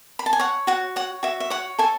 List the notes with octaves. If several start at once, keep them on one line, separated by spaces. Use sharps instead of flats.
B5
A5
G#5
C#5 F#5
F#4 F#5
C#5 F#5
F#4 E5
E5
C#5 F#5
A4 E5 G#5